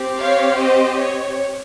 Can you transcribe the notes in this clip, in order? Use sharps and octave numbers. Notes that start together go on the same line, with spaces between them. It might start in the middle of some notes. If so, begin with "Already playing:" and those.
Already playing: C4 G4
C#5 F5
C5 D#5
C#5